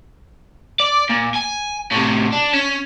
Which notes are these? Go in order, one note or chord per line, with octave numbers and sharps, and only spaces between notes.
D5
A#2
G#5
A2 C3
D4
C#4